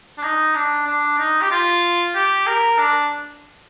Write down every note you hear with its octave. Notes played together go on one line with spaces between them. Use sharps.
D4
D#4
D4
D4
D#4
G4
F4
G4
A#4
D4